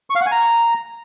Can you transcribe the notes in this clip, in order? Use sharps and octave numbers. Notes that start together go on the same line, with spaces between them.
C#6
F5
F#5
G#5
A#5